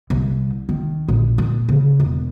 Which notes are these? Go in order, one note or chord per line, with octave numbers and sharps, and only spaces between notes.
C2
D#3
A#1
A#2
C#3
E1